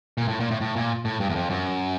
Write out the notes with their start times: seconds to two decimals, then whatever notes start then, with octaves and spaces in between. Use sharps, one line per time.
0.18 A#2
0.28 A2
0.40 A#2
0.51 A2
0.61 A2
0.76 A#2
1.05 A2
1.20 G2
1.29 E2
1.35 F2
1.50 F#2